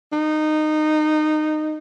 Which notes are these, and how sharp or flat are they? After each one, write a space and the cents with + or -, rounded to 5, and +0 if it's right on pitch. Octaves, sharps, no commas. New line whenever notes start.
D#4 -20